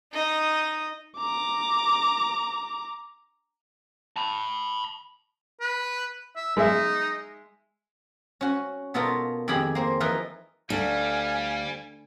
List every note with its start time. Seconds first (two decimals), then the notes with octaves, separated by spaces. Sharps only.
0.13 D#4 D#5
1.17 A#5 D6
4.16 A5 B5
5.61 B4
6.36 E5
6.57 G#3 D#4 E5
8.41 C#4 F#4
8.94 B2 B3 D#4 F4 A4 A#4
9.48 F2 D#3 G4 G#4 B5
9.75 A#3 C5
10.00 E3 F3 D#4 A#4 B4
10.70 D2 G3 F5 G#5